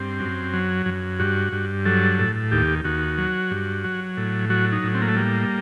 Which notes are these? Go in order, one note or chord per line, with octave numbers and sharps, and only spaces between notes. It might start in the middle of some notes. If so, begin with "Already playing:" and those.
Already playing: G2 C4
F#2
F#3
F#2
G2 F#4
G2
F#3 A4
A2
D#2 G4
D#2 F#4
F#3
G2
F#3
A2
F#3 F#4
D#4
A2
C4
A#3
A3
G3 A#3